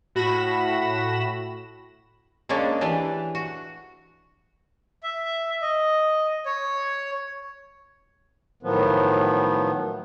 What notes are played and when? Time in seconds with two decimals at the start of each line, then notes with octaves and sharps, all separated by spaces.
0.15 A2 F#4 B5 A#6 E7
2.49 G#3 A#3 C#4 D4
2.81 E3 D4 G4 B4
3.35 F#4
5.03 E5
5.62 D#5
6.46 C#5
8.63 A2 D#3 F3 F#3 B3